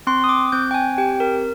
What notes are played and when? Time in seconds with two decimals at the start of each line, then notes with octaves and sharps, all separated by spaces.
0.07 C4 C6
0.24 D#6
0.29 D6
0.52 C4 G6
0.71 G5
0.74 G#5
0.98 G4 G5
1.20 A#4